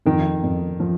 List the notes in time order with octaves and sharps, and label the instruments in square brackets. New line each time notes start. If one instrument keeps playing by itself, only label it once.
[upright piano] F2 [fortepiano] D#3
[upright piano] F2
F3